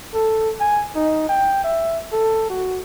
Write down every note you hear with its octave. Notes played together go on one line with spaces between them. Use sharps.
A4
G#5
D#4
G5
E5
A4
F#4